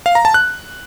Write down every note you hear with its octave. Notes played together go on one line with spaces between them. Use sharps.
F5
A#5
A5
F#6